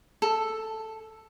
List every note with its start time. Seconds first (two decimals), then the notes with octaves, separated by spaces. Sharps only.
0.22 A4